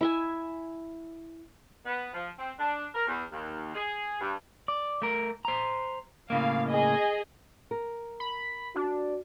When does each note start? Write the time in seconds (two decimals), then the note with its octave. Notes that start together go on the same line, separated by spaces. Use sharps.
0.01 E4 E5 G#5
1.85 B3
2.13 F3
2.38 C4
2.59 D4
2.94 A#4
3.06 E2
3.31 D#2
3.74 G#4
4.21 G2
4.68 D5
5.02 A3 A#4
5.45 C5 A#5
6.30 A2 C#3 A#3 F5
6.68 G#4 D#5
7.71 A#4
8.20 B5
8.76 D4 F#4